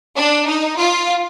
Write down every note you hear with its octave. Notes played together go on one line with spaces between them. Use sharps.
D4
D#4
F4